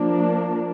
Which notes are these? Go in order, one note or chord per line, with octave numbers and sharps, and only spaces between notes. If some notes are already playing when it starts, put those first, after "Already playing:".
Already playing: F3 A#3 D4